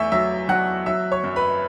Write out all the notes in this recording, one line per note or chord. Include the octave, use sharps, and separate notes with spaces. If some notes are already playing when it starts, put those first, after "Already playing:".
Already playing: E2 A3 E5 C#6 E6
F#3 E5 E6
F#3 F#5 F#6
F#3 E5 E6
C#5 C#6
F#2
B4 B5